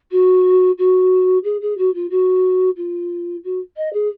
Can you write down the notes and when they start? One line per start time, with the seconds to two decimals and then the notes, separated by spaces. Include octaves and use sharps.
0.11 F#4
0.78 F#4
1.44 G#4
1.61 G#4
1.78 F#4
1.94 F4
2.10 F#4
2.77 F4
3.44 F#4
3.77 D#5
3.93 G#4